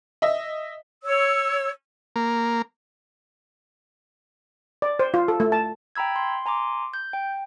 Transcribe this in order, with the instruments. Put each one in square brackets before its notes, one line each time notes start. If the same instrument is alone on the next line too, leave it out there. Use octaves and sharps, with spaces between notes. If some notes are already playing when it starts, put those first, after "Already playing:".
[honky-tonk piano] D#5 E5
[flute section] C#5 E6
[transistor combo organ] A#3
[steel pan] D5
C5
F4
A4
A3
A5
[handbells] G5 A#5 B5 E6 G#6
C6
G#5 A#5 C6 D6
G6
G5